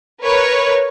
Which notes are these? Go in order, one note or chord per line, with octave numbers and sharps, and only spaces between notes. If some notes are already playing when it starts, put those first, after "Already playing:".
A#4 B4 C#5